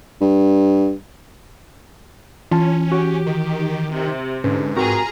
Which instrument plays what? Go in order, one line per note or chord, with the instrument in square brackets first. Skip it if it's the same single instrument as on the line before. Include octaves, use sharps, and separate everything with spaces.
[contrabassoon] G2
[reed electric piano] E3 [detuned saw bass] C#4 [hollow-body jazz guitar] F4 A5
[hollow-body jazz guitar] F#4 [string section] G4
[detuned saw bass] D#3
[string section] C3
[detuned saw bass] G#2 [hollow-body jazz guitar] D3 C#4 [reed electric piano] B4
[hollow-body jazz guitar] C4 F#4 A#4 [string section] F4 G#4 A#5